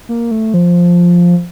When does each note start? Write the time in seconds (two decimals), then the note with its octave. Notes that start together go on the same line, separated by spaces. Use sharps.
0.09 A#3
0.31 A3
0.54 F3